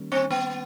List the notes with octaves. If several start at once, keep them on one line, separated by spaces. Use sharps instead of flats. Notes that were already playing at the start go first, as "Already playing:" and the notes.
Already playing: D#3 G3 A#3 C#4
C4
B3